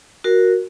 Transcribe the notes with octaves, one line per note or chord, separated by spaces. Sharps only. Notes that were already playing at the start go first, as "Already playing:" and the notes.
F#4 A#4